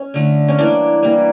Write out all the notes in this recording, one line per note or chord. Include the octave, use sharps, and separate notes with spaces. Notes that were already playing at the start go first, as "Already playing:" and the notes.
Already playing: C#4
D3 A3
C#4
E3 G3 A#3 D4
E3 G3 A#3